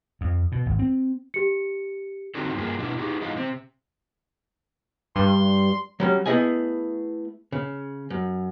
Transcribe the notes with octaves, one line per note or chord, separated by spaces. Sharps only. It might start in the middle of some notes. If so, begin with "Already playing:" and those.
F2
B2
G#1
C4
G4 C#7
D3 C4 D4 D#4 F#4 A4
G2 F3 A#3 G#4
B2 D4 E4
D#4 G4 G#4
E3 G#3 D#4 F4
C3 C4
G2 C6
F#3 G3 C#4
A3 B3 E4 G#4 D#5 G#5
C#3
F#2